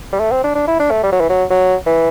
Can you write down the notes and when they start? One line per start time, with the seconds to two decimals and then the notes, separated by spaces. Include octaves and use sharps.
0.13 G3
0.20 A3
0.32 C4
0.44 D4
0.55 D4
0.68 E4
0.80 D4
0.91 A3
1.03 G3
1.12 F#3
1.21 E3
1.30 F#3
1.51 F#3
1.86 E3